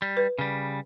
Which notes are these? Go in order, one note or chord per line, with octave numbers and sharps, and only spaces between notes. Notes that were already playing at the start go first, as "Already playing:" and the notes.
G3
B4
C#3 G3